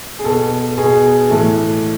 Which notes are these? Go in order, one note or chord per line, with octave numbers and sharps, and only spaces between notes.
G#4
B2 A4
B2 G#4
A2 E3 A4